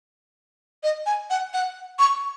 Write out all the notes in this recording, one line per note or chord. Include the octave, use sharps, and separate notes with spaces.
D#5
G#5
F#5
F#5
C#6